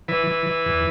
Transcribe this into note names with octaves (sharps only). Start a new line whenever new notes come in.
E3 B4
E3
E3
E2